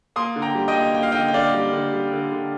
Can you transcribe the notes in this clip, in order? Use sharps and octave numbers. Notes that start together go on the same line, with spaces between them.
A#3 C6 D#6
D3
G5 A#5
G3
D#5 G5
A#3
A#3 G5
F5
D3 D#5 G5
G5
D3 D5 F5
G3
D3
G3
D3
D3